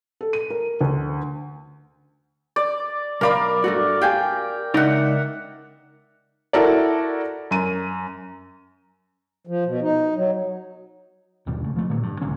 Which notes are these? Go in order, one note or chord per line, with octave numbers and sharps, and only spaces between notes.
A4
D#7
A#4
D2
D5
B1 A#4 D5 F5 B5
G2 A3 F#4
G4 F5 G5 G#5
C#2 D#4 D5 E5 F#5
E4 F#4 A4 A#4 D5
F#2 D#7
F3
B2
D#4
F#3
G1 D#2 B2 G3
C#3 E3 A3
F3 A3
A#2 D3 D#3 F#3
G2
D1 C#2 D3 C#4